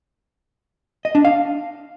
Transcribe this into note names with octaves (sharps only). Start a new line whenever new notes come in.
D#5
D4
F5